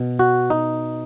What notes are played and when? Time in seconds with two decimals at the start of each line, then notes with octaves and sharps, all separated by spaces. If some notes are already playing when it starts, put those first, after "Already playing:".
Already playing: B2
0.19 F#4
0.50 D#4